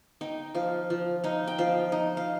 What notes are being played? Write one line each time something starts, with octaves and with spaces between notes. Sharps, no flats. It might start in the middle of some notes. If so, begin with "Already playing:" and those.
D#4 G5
F3 F5
F3
D#4 F5
G5
F3 F5
D#4
F5